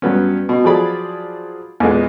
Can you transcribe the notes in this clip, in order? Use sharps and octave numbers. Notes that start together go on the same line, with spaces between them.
G2 F#3 B3 C#4
B2
F3 F#3 F4 G#4 D5 B5
E2 A#2 G#3 B3